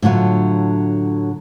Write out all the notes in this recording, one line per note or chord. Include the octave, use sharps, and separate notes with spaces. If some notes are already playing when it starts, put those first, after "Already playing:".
A2 D3 F#3 F4